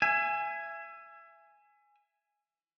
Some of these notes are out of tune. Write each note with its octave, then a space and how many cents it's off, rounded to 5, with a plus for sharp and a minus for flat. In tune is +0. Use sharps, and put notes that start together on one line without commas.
E5 +25 G#5 +0